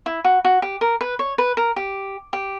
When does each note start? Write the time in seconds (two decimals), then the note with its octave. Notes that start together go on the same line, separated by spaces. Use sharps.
0.06 E4
0.24 F#4
0.45 F#4
0.62 G4
0.81 A#4
1.01 B4
1.19 C#5
1.38 B4
1.57 A#4
1.76 G4
2.33 G4